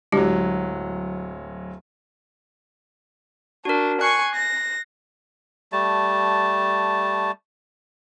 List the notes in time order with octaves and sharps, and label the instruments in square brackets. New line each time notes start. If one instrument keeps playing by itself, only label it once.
[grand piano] D1 F#3 [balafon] G#3 D4 G4
[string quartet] D4 [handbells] F#4 A#4
[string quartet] G#5 C#6 [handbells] F#6 C7
[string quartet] A#6
[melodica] G3 A3 A5